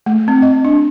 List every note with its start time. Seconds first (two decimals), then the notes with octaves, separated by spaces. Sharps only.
0.06 A3
0.28 C4
0.42 D#5
0.65 D4